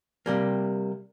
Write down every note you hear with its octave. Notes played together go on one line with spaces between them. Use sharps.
C3 G3 A#3